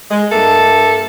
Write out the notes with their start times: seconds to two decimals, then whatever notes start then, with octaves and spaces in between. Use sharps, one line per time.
0.11 G#3
0.31 G2 A#3 A4 E5